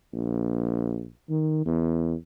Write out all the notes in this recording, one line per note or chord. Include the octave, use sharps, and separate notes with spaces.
A#1
D#3
E2